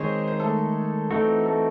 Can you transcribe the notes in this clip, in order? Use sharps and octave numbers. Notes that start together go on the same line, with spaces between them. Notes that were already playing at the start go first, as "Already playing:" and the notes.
Already playing: D#3 G#3 C4 D#4 G#4 C5 C#5
C5
A3 A4
E3 A3 C4 D#4 F#4 A4
A3 A4